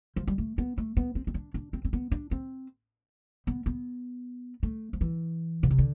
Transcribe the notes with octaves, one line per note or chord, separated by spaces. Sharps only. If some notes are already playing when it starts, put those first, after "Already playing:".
F3
G3
A3
B3
A3
B3
C4
C4
D4
D4
C4
C4
B3
D4
C4
B3
B3
A3
F3
E3
B2
C3
D3